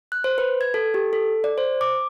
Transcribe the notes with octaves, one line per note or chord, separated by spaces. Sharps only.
F#6
C5
B4
G#6
A4
G4
A4
D5
C5
D6